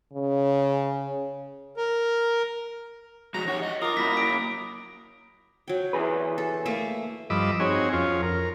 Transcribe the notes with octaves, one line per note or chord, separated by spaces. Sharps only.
C#3
A#4
F3 G#3 F#4 A#5
D#4 G4 C#5 F#5
F#4 C#5 D#5
F4 A#4 D6 D#6
F#3 A#3 E4 B5 A#6 B6
D7
F#3 G5
E3 G#4 B4
A4
A3 A#3 A4
G2 F3 D#5 B5 D6 E6
C4 D#4 F#4 G#4 C#5
F2 C#4 F4
A#4